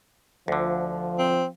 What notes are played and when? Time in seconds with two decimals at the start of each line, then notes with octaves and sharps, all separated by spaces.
0.48 D2 D3 F3
1.18 C4